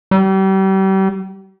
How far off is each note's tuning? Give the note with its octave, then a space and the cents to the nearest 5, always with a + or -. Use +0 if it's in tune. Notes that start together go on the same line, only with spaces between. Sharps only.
G3 -35